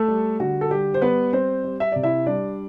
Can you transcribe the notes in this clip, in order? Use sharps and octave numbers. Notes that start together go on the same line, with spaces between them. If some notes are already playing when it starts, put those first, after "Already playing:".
Already playing: A3 A4
G3
D3 F#4
A4
G3 G4
C5
G3 B3 B4
G3 C4 C5
G3
E5
C3 D5
E4 E5
G3 D4 D5